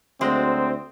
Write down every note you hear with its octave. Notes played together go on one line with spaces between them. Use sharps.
D2 F#3 G#3 C4